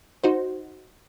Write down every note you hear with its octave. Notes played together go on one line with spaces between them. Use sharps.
D#4 F#4 C5